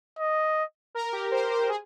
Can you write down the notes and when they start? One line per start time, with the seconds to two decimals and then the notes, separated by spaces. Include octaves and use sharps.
0.19 D#5
0.95 A#4
1.13 G4
1.31 C5
1.50 C5
1.69 G#4